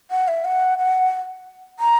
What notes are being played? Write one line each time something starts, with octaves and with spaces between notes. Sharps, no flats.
F#5
E5
F#5
F#5
A#5